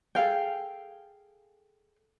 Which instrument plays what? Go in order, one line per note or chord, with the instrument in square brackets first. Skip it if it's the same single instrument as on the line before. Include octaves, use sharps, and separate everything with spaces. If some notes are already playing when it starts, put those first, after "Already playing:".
[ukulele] G#4 A4 F5 G5